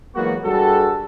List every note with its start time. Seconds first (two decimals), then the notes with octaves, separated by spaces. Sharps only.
0.15 E3 F#3 G#3 A#3 B3 F#4
0.45 G2 G3 F#4 G#4 A4